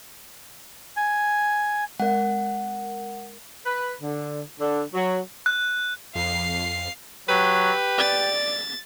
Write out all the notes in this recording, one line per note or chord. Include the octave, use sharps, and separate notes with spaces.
G#5
G#3 A#4 F#5
B4
D3
D3
F#3
F#6
F2 F5 C7
F#3 G4 B4
D5 A6